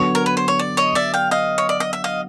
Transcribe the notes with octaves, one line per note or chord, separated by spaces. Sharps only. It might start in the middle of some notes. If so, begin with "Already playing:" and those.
Already playing: D3 F#3 B3 C#5
A#4
B4
C5
C#5
D5
C#5 D#5
D5 E5
F5 G5
D#5 F5
C#5
D5
D#5
E5
D#5 F5